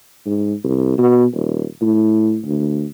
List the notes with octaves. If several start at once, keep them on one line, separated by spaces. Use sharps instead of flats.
G#2
C2
B2
D#1
A2
D2